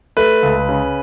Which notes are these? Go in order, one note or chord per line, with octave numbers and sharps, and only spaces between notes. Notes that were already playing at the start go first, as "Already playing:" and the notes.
A3 B4
C#2
C#3